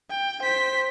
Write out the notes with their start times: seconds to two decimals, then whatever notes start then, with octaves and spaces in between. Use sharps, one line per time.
0.10 G5
0.43 C5 B6